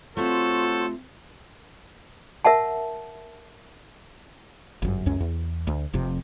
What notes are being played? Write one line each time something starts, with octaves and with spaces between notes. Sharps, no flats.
C3 A3 F4 F#4 A4 C5 C#5
A#4 E5 F#5 A5
G1 F#2
C#2 F#2 C#4
E2
D2
F1 F2 C3